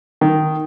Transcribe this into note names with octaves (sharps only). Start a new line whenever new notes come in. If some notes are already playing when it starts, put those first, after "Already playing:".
D#3